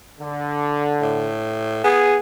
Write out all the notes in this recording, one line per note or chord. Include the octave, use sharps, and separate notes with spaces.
D3
A2
B3 G#4